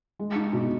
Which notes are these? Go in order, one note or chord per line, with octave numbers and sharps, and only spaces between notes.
G#3
D#4
B2